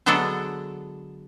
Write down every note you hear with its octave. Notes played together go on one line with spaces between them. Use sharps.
D3 F#3 G#3 B3 D4 A4